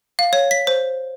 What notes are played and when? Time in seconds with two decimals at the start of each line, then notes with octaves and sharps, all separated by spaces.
0.19 F5
0.33 C#5
0.51 B6
0.67 C5